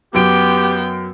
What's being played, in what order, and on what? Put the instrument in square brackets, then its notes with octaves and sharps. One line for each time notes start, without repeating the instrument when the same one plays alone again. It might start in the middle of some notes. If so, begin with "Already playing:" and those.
[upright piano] F#2 D7 [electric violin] B3 G5 [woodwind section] G4